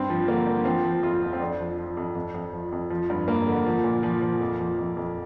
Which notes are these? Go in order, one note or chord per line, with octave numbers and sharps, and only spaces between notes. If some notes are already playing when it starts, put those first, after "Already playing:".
Already playing: G2 C4
F3
D3 A#3
G2
F3 C4
F3
F2 F4
F2
C4
F2 D4
F3
F3
F2
F2
F2
F3
F2
F3
G2
G2 A#3
D3
F3
A#2
F3
F3
F2
F3
F2
F2